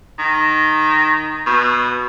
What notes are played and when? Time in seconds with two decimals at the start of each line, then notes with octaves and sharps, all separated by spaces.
0.19 D#3
1.46 B2